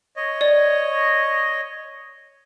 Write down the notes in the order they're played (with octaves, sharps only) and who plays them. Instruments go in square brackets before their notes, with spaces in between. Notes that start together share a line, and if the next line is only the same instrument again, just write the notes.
[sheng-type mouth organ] C#5 D#5
[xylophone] D5